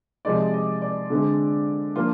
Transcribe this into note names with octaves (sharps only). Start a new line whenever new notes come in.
C3 F3 G#3 D#4 D5
D#5
D5
D3 G#3 C4
F3 A#3 D4 F4